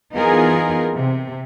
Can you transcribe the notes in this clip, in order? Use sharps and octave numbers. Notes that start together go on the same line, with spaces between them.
E3 B3 D#4 F4 G#4 A#4
C3